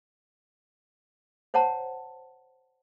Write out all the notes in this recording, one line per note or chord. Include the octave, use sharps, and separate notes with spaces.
C5 C#5 F#5 A5 A#5